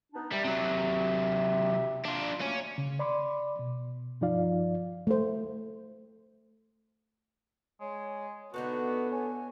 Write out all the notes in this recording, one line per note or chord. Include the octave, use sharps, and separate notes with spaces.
B3 D4 D#4
G3 G4 E5
C3 F#3
D4 F4
F#3 A3 A#3 C#4
C#3
D5 B5 C6 D6
B2
G2 F3 D#4 F4 D5 F5
A3 C5
G#3 C#5
D3 B3 D#4 F#4 A4 B4
C#5 G#5